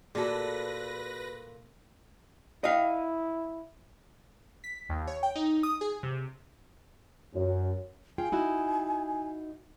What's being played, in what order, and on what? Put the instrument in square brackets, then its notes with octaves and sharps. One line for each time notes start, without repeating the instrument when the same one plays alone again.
[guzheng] A#2 A4 [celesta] F#4 G#4 [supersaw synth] B4 A#6
[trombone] E4 [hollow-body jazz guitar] D#5 F5
[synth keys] B6
D#2
C#5
G5
D#4
D#6
G#4
C3
[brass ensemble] F#2
[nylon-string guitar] F4 G#4 G5 [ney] G#5
[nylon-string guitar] D#4 E4 F#4